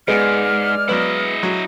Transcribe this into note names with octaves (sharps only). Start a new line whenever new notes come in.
G#2 G#3 B3 D5 F6
F#3 B3 E4 D#5
F#3